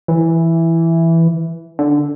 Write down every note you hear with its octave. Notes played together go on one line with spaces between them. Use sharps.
E3
D3